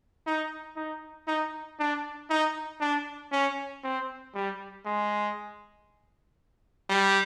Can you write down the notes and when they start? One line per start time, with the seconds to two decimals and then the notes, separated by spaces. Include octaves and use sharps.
0.26 D#4
0.76 D#4
1.27 D#4
1.79 D4
2.30 D#4
2.80 D4
3.31 C#4
3.83 C4
4.34 G3
4.85 G#3
6.89 G3